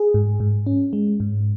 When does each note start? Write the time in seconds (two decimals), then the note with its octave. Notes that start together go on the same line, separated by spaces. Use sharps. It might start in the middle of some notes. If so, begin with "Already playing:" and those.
Already playing: G#4
0.14 G#2
0.40 G#2
0.66 C#4
0.93 G#3
1.20 G#2